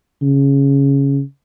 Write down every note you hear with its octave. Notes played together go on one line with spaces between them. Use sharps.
C#3